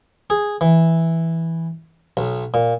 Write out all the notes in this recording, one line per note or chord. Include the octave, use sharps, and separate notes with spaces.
G#4
E3
B1
A#2